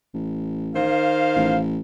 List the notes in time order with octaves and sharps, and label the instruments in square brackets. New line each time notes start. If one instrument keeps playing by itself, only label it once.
[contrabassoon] A1
[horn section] D#3 C5 F5
[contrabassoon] A1